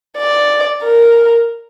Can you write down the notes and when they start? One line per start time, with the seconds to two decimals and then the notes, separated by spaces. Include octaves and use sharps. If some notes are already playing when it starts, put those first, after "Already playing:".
0.18 D5
0.84 A#4